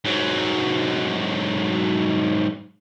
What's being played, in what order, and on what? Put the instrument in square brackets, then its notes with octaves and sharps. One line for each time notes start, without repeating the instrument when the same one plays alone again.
[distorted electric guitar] G#2 F#3